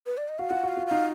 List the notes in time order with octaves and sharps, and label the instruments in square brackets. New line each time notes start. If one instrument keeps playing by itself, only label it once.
[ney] B4
D5
D#5
[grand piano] F#4 [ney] F5
[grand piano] F4 [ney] F#5
[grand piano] F#4 [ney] F5
[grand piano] F4
[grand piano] D#4 [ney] F5